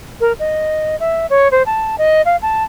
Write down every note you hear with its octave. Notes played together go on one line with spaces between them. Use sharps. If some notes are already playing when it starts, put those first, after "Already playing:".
A#4
D#5
E5
C#5
C5
A5
D#5
F5
A5